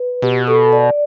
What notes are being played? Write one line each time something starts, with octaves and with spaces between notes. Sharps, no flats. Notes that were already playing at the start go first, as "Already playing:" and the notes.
Already playing: B4
B2 G4
A4
D5